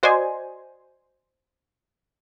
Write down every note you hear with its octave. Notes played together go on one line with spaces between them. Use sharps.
F#4 C5 D5 D#5 G#5